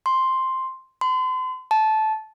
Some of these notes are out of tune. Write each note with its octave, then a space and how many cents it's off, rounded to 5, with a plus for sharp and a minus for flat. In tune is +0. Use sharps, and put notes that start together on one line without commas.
C6 +5
C6 -40
A5 -15